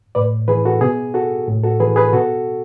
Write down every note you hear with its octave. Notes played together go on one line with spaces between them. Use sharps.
A2 B4 D5
E3 G#4 B4
F#4 A4
B2 G#4
F#4 A4
A2
F#4 A4
E3 G#4 B4
G#4 B4
B2 F#4 A4